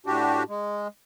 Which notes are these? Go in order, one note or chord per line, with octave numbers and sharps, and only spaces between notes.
A2 D4 F#4 G4
G#3